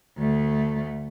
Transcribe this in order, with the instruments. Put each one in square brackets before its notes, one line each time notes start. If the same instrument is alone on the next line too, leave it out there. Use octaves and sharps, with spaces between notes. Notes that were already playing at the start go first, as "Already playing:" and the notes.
[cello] D2 A3